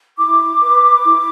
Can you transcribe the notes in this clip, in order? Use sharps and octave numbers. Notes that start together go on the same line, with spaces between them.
E4 D6
B4
E4